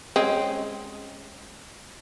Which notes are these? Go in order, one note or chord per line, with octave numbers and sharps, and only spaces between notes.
G#3 C4 C#4